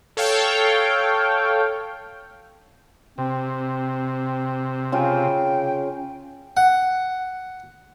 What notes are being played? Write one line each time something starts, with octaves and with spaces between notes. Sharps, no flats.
A4 C#5 F5 G5
C3 C4
C#3 F4 G5 G#5
F#5